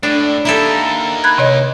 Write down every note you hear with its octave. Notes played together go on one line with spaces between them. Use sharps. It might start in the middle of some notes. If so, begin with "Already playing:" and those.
A2 D4
A#3 D#4 E4 G4 A4
B5 F#6 G#6
C3 C#5 D#5